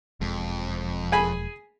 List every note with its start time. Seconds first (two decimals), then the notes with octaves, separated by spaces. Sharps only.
0.21 E1 F2 F3 G#3
1.12 G#4 G#5 B5